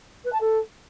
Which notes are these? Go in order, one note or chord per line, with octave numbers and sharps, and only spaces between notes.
B4
A5
A4